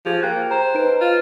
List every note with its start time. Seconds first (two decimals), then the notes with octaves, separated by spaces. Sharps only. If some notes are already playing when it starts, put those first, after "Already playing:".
0.06 F3 G4 G#4 G#6
0.23 A#3 G5 F#6
0.51 C5 A#5
0.75 D#4 B4 D7
1.01 F4